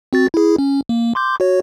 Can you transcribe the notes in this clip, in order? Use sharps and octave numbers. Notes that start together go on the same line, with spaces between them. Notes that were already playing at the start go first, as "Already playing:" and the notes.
C4 F#4 A6
E4 G#4
C#4
A#3
C6 D6 G6
F#4 C#5